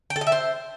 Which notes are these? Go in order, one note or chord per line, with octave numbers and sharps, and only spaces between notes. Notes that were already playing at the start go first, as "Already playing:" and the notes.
G5
A4
D#5
E5
C5